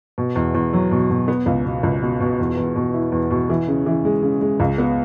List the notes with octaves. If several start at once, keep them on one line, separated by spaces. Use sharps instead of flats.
B2
E2
E2
F#3
B2
B2
B3
C#2
B2
C#2
B2
B2
E2
E2
B2
E4
E2
B2
E3
C#3
E3
G#3
C#3
G#3
C#2
B3